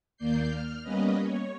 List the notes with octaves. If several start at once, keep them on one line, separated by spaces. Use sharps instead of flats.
D#2 A#3 D5 G6 C7
F6
G3 A#3 B3 C#4 B4 D#5
C#5